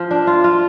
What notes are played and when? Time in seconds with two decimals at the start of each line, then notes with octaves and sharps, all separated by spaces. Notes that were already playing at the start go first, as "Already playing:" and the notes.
Already playing: F3
0.11 D4
0.27 F4
0.44 F4